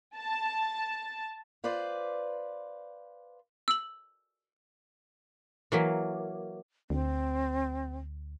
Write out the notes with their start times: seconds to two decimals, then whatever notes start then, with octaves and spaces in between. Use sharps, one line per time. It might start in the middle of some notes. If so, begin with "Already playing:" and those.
0.16 A5
1.64 F4 B4 C5 D5
3.68 E6 F#7
5.72 E3 F#3 A#3
6.90 D2 C4